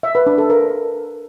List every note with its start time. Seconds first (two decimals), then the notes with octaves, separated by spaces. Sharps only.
0.03 E5
0.15 B4
0.27 D4
0.38 A4
0.50 A#4